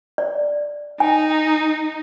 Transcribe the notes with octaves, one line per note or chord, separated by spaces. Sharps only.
D5
D#4 G#5